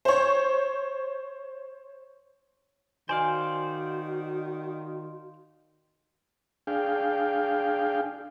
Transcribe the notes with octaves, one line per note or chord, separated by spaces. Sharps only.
C5 C#5
D#3 F#4 C5 D5 F5 G#5
D4 G#4 F5 G5